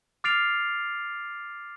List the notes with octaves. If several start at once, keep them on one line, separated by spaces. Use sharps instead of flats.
D6 F6 A6 C7 D7 F7